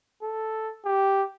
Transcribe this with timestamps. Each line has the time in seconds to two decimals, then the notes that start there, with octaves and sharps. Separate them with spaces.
0.22 A4
0.85 G4